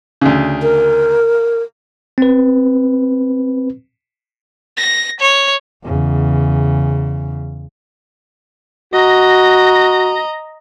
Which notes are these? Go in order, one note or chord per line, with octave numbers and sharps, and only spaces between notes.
D2 C#3
A#4
C4 B4
A#6
C#5
E2 C#3
F#4 D#5 A#5